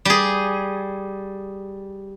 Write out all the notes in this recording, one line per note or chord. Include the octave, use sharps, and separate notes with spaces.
G3 G#4